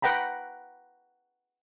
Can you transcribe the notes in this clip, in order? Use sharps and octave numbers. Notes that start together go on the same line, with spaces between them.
B4 F#5 G5 A#5 B5